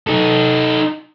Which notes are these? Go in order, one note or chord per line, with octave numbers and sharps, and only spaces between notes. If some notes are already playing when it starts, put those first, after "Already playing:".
D#4 A4